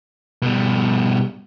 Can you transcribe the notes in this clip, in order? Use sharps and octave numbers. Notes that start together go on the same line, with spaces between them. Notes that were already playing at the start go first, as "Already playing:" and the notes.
B2 G3